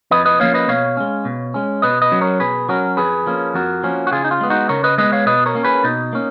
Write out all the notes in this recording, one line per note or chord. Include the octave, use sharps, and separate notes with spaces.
F2 B4 D#5
B4 D#5
F3 A#3 C#4 C#5 F5
B4 D#5
B2 C#5 F5
G#3 C#4
B2
G#3 C#4
B2 B4 D#5
B4 D#5
F#3 C#4
A#4 C#5
B2 G#4 B4
F#3 C#4 F#4 A#4
F2 G#4 B4
F3 A#3 C#4
F2 F#4 A#4
F3 A#3 C#4
F#4
C#3 F4 G#4
D#4
F4
G#3 B3
D#4 F#4
C#3 A#4 C#5
B4 D#5
G#3 B3 B4 D#5
C#5 F5
B2 B4 D#5
A#4 C#5
A#3 C#4
G#4 B4
B2 D#4
A#3 C#4